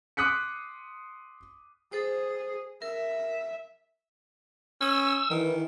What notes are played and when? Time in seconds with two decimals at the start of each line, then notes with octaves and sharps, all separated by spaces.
0.17 C6 D6 D#6 F#6 B6 C#7
1.92 G#4 A4 C5 D#6
2.82 A#4 E5
4.81 C#4 E6
5.31 D#3 E3